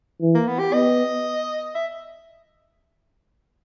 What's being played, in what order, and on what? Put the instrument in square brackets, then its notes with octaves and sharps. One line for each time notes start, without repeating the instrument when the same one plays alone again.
[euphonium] E3
[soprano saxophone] A#3
B3
G4
[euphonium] B3 [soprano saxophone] D#5
[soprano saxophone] E5